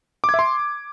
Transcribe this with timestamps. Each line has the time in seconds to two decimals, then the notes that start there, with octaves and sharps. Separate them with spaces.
0.24 D6
0.29 G#6
0.34 E5
0.39 C6